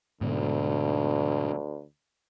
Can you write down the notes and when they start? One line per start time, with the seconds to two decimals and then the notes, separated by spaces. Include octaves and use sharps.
0.21 D2 G#2 B2 D3